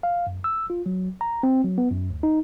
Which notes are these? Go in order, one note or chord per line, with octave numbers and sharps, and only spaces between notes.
F5
F#2
E6
F4
F#3
A#5
C4
F#3
B3
F#2
D2
D#4